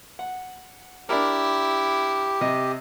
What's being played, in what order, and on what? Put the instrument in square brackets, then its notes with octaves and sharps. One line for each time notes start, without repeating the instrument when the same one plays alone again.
[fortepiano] F#5
[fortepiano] D4 A#4 [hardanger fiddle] E4 [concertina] G4
[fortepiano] C3 D#5